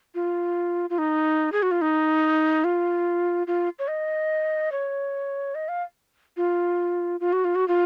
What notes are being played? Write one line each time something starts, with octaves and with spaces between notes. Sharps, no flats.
F4
F4
D#4
G#4
F#4
F4
D#4
F4
F4
C#5
D#5
C#5
D#5
F5
F4
F4
F#4
F4
F#4
F4